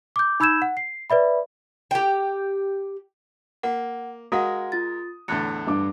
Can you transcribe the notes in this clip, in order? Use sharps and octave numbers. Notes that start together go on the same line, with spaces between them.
D6 G6
D#4 B5 E6 G6 G#6 E7
F#5
C7
B4 D5 E5 B5
G4 G5
A#3 F#5
G#3 F#4 A#4 F5 F#5 D#6
F4 A6
E2 A2 D3 F#6 C#7
G2 D6